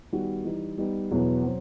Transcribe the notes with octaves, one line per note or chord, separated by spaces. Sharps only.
D#3 G3 B3 F#4
E3 G3 D#4
G3 B3 D#4
E2 B2 F#3 B3 E4
F#3 C4